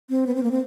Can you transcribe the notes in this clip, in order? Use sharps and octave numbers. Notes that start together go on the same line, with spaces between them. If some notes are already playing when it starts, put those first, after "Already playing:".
C4
B3
C4
A#3
C4